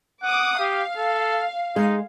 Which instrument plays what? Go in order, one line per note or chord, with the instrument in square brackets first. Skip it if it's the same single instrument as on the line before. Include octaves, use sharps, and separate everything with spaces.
[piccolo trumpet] F#5 [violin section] D6 D#6
[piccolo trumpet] G4 [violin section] F5
[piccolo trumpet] A4
[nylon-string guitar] G#3 [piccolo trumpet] D#4